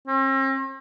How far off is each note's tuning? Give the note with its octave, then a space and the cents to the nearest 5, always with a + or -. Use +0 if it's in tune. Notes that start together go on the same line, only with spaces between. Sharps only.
C4 +45